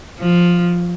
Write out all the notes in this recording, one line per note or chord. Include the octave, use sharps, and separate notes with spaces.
F3